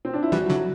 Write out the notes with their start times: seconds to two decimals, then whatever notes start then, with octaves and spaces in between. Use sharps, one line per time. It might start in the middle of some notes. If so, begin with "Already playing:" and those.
0.05 C4
0.14 D4
0.23 E4
0.32 E3 G3 F#4
0.50 D3 F#3